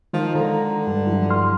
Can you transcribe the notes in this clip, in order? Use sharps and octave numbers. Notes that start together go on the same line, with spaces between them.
D#3 F3 G#3
D3 A#5
G2
F3 F#3 E4
C6 F6